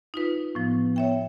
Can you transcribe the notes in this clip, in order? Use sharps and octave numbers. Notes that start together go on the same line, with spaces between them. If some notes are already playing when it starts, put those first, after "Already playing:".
D#4 F4 B4
A2 F3 B3
C#5 E5 G5